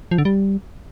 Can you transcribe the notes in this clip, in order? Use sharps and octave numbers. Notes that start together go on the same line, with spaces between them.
F3
D3
G3